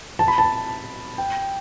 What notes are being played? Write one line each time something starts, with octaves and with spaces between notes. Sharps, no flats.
A5
B5
A5
G5